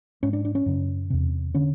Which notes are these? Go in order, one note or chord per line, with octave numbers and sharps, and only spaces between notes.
G#2 C#4
D4
D4
C#4
F#2 C#3
E2 C3
D3 C#4